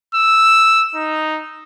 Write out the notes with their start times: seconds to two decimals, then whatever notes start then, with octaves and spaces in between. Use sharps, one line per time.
0.14 E6
0.95 D#4